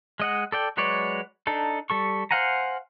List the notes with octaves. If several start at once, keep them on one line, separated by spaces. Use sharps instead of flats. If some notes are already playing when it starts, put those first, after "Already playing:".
G#3 D#5 F#5
A4 D5 G5
F#3 G#3 B4 C#5 D5
D4 D#4 A4
G3 A4 C#6
C5 F5 F#5 G#5 A#5